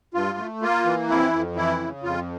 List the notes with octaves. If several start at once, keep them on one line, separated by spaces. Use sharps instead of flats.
G2 F4
A3
A#3 F4
E3
F2 E4
F2
E3 E4
C#3
F2 F4